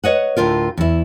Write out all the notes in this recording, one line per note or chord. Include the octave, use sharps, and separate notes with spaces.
B4 C#5 D#5 F#5
D2 A2 F4 A#4
E2 E4